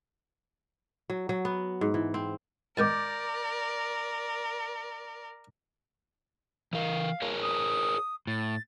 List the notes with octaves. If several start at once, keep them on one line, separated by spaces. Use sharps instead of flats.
F#3
F#3
B3
G#2
E3
C4
G#2 D#3 B3 A#4 D5 D6 G6 A6
E3 A#4 F5
G#4 A#4 C#5
D#6
A2 A6